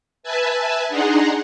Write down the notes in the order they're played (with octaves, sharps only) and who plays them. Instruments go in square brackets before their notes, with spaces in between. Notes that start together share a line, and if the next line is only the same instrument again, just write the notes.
[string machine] B4 E5 G#5 A5
D4 D#4 G#4 F#5 A#5 C6